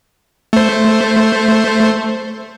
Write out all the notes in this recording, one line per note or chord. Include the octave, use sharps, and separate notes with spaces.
A3 C5